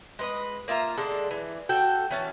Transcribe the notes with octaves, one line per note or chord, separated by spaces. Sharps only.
G#3 B4 D#5
A#3 F4 E5 A#5
D3 G#3 A4 D5
E3
F#4 A4 G5
E3 C#4 A5